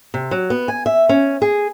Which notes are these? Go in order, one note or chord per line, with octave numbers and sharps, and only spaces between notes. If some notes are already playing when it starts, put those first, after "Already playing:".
C3
F#3
B3
G#5
E5
C#4
G#4